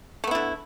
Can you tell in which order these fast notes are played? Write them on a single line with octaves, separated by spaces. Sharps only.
A3 B3 E4 D3